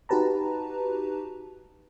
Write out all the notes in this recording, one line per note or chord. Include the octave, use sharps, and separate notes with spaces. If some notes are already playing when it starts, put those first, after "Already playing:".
D#4 F#4 G4 B4 A5 A#5